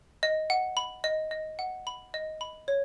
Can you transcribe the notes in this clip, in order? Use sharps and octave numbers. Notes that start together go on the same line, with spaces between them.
D#5
F#5
B5
D#5
D#5
F#5
B5
D#5
B5
C#5